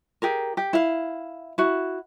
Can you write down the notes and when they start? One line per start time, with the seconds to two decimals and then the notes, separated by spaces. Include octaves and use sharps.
0.22 G4 G#4 A#4
0.57 G4
0.73 E4 F5
1.58 E4 F#4